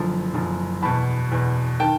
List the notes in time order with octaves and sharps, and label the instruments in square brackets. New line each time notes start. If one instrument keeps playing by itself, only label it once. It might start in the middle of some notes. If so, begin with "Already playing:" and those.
Already playing: [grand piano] F#1 F#2 D3 F3
F#1 F#2 D3 F3
E2 B2 A5 B5
E2 B2
D#3 G5 A5